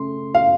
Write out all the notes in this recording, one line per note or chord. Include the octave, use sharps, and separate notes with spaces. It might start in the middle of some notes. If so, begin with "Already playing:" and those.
Already playing: C#3 A3 C6
F5